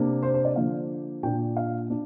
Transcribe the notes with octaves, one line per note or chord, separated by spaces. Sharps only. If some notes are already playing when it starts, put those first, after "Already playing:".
Already playing: C3 A#3 D4
C5
C5
D5
D3 F3 A#3 D4 F5
A#2 A#3 D4 G5
F5
D4